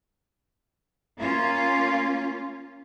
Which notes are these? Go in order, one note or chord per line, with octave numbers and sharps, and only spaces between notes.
A#3 C#4 F4